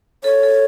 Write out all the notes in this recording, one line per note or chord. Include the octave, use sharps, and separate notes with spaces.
A4 C#5
A4